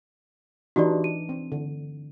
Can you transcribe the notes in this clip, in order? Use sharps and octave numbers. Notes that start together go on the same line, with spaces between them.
E3 D4 D#4 F#4 G4 D5
D#7
C4
D3